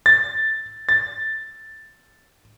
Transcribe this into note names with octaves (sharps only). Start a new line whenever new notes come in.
A6
A6